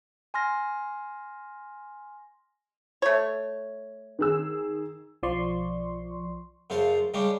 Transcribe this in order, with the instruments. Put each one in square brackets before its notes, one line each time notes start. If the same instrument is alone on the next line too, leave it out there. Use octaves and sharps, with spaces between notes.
[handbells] G#5 C6 F6 A#6
[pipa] A3 C#5
[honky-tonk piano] D#3 G#4 E6
[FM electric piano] B1 F3 D5 C6 C#6
[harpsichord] F#2 C#3 F4 C5 F5 A5
C#3 G3 G#3 C#4 D4 G4